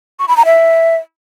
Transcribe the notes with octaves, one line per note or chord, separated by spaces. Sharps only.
C#6
B5
A#5
E5